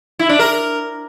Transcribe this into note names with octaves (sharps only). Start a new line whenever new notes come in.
E4
D4
A#4